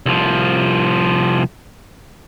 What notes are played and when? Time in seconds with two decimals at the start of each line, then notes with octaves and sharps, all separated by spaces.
0.06 C2 F3